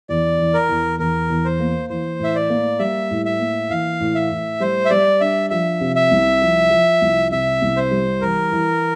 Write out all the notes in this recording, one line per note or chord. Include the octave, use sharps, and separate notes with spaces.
E2 D5
E3
A#4
E2
E2 A#4
E2
C5
A#3
E3 C5
A2 E5
D5
A#3
G3 E5
A2
E5
A#3
E3 F5
A2
E5
A2
G3 C5
E5
G3 D5
D4 E5
F3 E5
C3
E5
C2
F3
F3
C2
C3 E5
C2
C5
G3
E3 A#4
E3